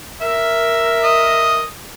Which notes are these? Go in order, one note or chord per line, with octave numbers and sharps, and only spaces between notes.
A#4 E5
D#5